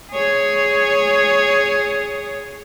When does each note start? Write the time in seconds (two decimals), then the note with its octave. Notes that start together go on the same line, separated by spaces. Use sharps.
0.11 G#4 C#5